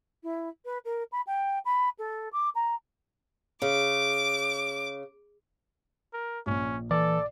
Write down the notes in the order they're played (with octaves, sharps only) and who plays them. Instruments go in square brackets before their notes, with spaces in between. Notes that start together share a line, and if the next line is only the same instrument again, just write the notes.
[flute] E4
B4
A#4
B5
G5
B5
A4
D6
A#5
[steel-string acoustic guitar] C#3 [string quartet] D6
[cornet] A#4
[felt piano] A#1 A#2 [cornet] C#4
[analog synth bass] E3 [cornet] A4 [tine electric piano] D5